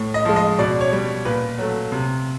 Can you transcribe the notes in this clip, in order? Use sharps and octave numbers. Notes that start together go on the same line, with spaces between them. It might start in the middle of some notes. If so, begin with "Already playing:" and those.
Already playing: A2
D#5
F3 G#3
D#5
B2 D5
C#5
G3
A#2 B4
F#3 A3
C3